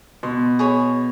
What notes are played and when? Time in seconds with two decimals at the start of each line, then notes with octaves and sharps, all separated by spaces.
0.23 B2 C6
0.59 G#4 C#5 B5